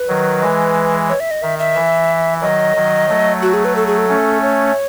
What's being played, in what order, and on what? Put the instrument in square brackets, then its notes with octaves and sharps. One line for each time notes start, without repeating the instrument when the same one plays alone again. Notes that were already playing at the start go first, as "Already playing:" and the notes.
Already playing: [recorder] B4
[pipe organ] D#3 F#3
E3 G#3
[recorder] C#5
E5
D#5
[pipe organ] D#3 [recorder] E5
[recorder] E5
[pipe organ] E3
[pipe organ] D#3 F#3 [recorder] D#5
[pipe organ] D#3 F#3
F#3 A3
[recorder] F#4
G#4
B4
A4
G#4
A4
[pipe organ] A3 C#4
[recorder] C#5